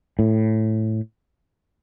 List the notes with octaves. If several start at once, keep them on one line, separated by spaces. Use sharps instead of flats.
A2